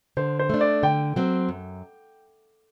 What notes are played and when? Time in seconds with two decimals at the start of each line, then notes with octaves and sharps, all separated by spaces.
0.17 D3 C5
0.39 C5
0.50 A3 D4
0.61 D5
0.83 D3 G5
1.16 F#3 C4
1.49 F#2